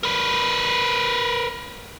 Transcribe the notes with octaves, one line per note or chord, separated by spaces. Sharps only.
A#4 B4